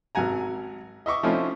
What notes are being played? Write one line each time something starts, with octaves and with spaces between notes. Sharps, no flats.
G#1 F#3 F#5 G#5 A#5
D#5 E5 C#6 D6
F3 A3 C4 C#4 D#4 E4